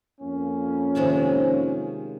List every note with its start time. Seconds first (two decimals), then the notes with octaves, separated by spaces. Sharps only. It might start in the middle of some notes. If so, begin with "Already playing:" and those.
0.20 F2 A#3 C#4
0.95 C3 D#3 G#3